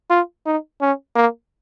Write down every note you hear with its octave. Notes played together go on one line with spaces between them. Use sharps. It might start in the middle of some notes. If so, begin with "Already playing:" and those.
F4
D#4
C#4
A#3